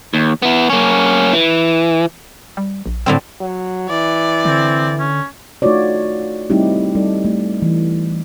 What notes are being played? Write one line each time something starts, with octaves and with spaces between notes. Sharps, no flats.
D#2
B3 E4
A#3 C#4
E3
G3
A#1
A2 D3 G3 C4
F#3
E3 D5
D3 C4
C#4
A3 D#4 F4 F#4 C#5 D5
G3 A3 C4 D#4 E4 G4
G3 D#4 A4 D5
A3
E3